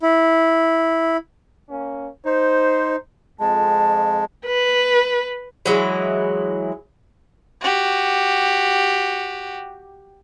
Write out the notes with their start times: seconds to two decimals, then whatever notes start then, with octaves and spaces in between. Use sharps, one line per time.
0.03 E4
1.69 A#3 C#4
2.25 D#4 C5
3.40 F2 G#3 A5
4.46 B4
5.66 E3 F#3 G#3 E4
7.62 F#4 G4